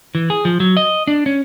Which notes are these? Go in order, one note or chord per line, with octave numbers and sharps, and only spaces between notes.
E3
G#4
F3
F#3
D#5
D4
C#4